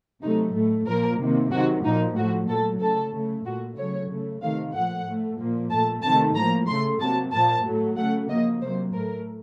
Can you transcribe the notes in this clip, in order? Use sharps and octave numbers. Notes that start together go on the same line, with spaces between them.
C3 F#3 A3 D#4
A2 A3
A#2 F3 A#3 A#4
C3 D#3 A#3
C3 D#3 F#3 F#4
A#2 F3 A#3 D#4
A2 F3 A3 F#4
A#2 F#3 A3 A4
C#3 A3 A4
C#3 A3
A#2 A3 F#4
C#3 F#3 A3 C#5
C#3 A3
C3 D#3 A3 F5
A#2 F3 A3 F#5
A2 A3
A#2 F3 A#3
A#2 A3 A5
C3 D#3 A3 A5
A2 F3 A#3 A#5
C#3 A3 C6
C3 F#3 A#3 A5
A#2 F3 A#3 A5
A2 F#3 A3
C#3 A3 F#5
C#3 F3 A#3 D#5
C3 F#3 A#3 C5
A2 A3 A#4